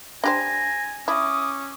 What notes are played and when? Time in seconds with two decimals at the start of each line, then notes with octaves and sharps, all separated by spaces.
0.24 D4 G4 C5 G#5 A#6
1.08 C#4 E4 D6 D#6